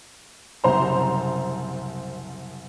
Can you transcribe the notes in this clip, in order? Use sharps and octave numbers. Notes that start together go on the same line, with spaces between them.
F#1 C2 C5 A#5